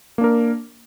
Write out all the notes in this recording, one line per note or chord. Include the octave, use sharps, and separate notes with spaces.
A#3 D4 A#4